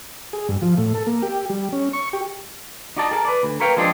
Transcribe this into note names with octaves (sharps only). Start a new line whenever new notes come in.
G#4
G2
F3
A2
A4
A#3
G4
G3
C#4
C#6
G4
D#4 F#4 D5 D#5 A5
G#4 A#4 A5
B4 D5
D2
A#4 B4 C#5 F5 G5
F3 G#3 C4 D4 G4 G#4